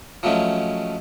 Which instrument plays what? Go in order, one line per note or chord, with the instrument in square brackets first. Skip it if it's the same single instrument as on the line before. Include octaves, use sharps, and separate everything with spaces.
[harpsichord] F3 F#3 G#3 A3 C#4